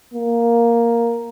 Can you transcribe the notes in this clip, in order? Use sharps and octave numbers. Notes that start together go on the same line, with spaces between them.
A#3